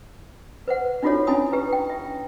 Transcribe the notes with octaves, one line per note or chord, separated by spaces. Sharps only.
B4 C5 F#5
D4 D#4 F4 F#4 A4 C#5
C#4 D4 E4 G#5 B5 D#6
G4 B4 A#5
G5
E5